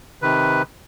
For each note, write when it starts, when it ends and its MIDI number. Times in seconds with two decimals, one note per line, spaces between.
0.22 0.62 48
0.22 0.62 51
0.22 0.62 71